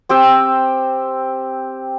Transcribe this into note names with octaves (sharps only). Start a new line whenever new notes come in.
C4 G4 G5 E6